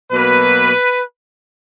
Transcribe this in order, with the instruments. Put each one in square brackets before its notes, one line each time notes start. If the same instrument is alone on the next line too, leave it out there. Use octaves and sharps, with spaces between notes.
[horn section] B2 F#3 A#3 B4